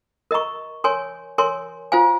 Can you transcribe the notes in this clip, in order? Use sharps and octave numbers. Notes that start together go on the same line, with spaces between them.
A#4 D#5 A#5 C#6
A#4 C#5 G#5 C6
A#4 C#5 G#5 C6
F4 C5 F5 G#5